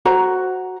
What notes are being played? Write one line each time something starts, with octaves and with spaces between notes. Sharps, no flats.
F#4 C5 A#5